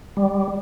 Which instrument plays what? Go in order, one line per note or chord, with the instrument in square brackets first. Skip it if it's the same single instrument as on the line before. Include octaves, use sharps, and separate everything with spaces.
[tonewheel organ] G3